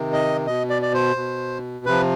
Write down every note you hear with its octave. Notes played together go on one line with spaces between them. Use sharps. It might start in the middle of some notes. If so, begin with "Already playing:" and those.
Already playing: C3 D#3
D#5
B2 D#5
D5
D5
C5
B2
C3 F3 B4